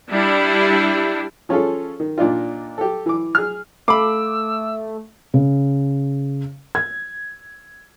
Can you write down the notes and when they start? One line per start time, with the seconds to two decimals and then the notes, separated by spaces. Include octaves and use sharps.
0.10 G3 D4 E4
1.49 F3 C#4 F4 G#4 A4
2.00 D#3
2.18 A#2 D4 D#4 F4
2.78 G4 A4
3.06 E3 D6
3.35 G#4 F6
3.88 A3 F5 B5 D6 E6
5.34 C#3
6.75 G#6